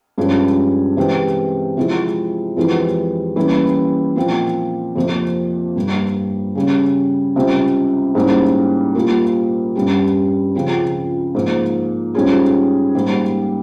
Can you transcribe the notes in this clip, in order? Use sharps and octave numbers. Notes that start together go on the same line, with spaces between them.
G2 F3 G#3 C#4 G4
C3 E3 G#3 C4 G4
C3 F3 G#3 E4 G4
F2 E3 G#3 E4 G4
E3 G3 A#3 C#4 E4
A#2 F3 C4
F2 C3 F3 A#3
G2 G3 A#3
C#3 G3 C#4
C#2 C3 G3 C4
G#2 G3 A#3 C#4 E4
A#2 G3 A#3 F4 A#4
G2 G3 C#4 G4
C#2 C#3 F3 C4
G#2 F3 A#3
G#2 G3 C#4 F4 G#4
G#2 G3 A#3